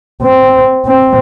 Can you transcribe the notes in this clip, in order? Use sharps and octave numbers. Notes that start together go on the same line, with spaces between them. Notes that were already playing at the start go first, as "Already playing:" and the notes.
C4
C4